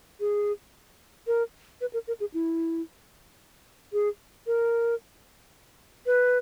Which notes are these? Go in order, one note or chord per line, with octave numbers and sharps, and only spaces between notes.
G#4
A#4
B4
A#4
A#4
G#4
E4
G#4
A#4
B4